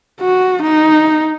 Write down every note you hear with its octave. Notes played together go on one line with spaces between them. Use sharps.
F#4
D#4